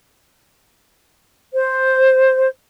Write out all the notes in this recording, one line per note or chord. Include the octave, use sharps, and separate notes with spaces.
C5